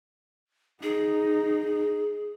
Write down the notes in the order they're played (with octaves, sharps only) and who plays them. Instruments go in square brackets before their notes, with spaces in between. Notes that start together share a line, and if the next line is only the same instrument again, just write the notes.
[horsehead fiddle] D#4 [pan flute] G#4